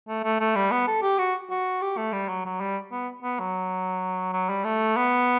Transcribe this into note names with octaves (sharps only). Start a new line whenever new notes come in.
A3
A3
A3
G3
B3
A4
G4
F#4
F#4
G4
A3
G3
F#3
F#3
G3
B3
B3
F#3
F#3
G3
A3
B3